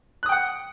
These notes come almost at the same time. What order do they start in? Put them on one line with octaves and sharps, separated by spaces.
F#6 D#6 G5 F#5